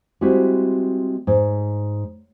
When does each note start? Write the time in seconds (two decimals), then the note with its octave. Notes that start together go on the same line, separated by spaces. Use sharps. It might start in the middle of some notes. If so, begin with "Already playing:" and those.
0.21 G3 G#3 C4 E4 F#4
1.27 G#2